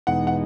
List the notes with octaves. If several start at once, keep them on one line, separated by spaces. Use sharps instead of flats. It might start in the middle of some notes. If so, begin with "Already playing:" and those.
E2 B2 G#3 D#4 F#5
F#5